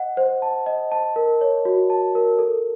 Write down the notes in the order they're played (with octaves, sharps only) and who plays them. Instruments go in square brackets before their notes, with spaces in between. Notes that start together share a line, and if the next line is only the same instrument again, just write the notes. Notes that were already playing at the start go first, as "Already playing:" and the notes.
Already playing: [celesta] D#5 F#5
C5
A5
D#5
A5
A#4
C#5
F#4
A5
A#4
A4